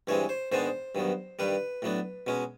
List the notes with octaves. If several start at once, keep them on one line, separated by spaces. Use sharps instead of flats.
G2 E3 G#3 C4 C#5
C5
G#2 D#3 G#3 B3 D4 C5
G2 D#3 F#3 B3
G2 D#3 G3 B4
A2 F#3 B3 D4
B2 G#3 C#4